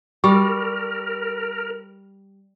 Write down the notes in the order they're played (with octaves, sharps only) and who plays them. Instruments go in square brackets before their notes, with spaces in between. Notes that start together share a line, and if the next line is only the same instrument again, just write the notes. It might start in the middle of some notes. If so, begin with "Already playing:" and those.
[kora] G3 [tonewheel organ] A#4 [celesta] C#6